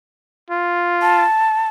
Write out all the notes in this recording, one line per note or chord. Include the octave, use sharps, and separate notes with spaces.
F4
A5